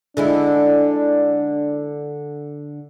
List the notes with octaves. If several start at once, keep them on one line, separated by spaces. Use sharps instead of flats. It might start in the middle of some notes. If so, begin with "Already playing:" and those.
D3 G#3 D4 E4